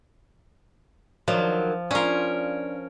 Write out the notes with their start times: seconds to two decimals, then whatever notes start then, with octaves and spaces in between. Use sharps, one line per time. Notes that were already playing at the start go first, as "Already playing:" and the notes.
1.28 D#3 F3 F#3 D4
1.91 C#4 D4 F4 A#4